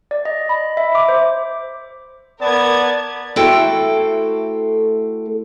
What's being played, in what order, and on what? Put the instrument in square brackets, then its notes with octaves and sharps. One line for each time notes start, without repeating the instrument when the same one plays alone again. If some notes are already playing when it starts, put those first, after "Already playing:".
[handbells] D5
D#5
B5
E5
D6
C5
[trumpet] B3 [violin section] A#4 G#6 [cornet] D5 [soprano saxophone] A5
[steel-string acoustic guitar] A3 E4 F#4 A4 C5 G5